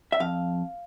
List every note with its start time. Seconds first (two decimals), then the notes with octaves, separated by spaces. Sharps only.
0.12 E5
0.20 F2 F5